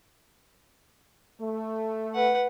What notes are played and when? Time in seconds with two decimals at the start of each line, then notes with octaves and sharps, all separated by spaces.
1.41 A3
2.14 B4 F#5